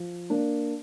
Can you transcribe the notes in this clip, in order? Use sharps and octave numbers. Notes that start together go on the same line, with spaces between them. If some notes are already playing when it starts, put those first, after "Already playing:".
Already playing: F3
A#3 D4